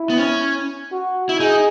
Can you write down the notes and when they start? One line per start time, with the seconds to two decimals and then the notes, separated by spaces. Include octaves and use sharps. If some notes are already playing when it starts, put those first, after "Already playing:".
Already playing: E4
0.10 B3
0.17 C#4
0.92 F#4
1.29 E4
1.40 D#4 G#4